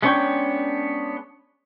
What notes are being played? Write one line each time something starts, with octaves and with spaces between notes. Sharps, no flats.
G#3 B3 C#4 D4 C#5 G5